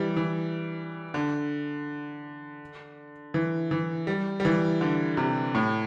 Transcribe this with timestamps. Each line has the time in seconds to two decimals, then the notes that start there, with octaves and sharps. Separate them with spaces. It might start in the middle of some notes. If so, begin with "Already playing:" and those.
Already playing: E3 G3
0.16 E3
1.14 D3
3.34 E3
3.71 E3
4.07 G3
4.40 G3
4.45 E3
4.81 D3
5.17 C3
5.55 A2